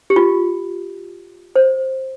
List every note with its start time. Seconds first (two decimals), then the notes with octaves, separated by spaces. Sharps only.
0.10 G4
0.16 F4
1.56 C5